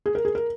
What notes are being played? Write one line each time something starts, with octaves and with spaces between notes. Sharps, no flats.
G#4
A#4
G#4
A#4